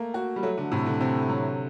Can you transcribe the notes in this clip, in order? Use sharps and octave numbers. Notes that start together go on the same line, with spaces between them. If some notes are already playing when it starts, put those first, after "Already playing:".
Already playing: A3 A#3
F#4
G3
F#3 A3
D3
A2 C3
D3
C3 C4
F#3